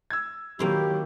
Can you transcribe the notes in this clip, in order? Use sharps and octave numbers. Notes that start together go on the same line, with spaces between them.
E6 G#6
D#3 F#3 A#3 C4 E4 G4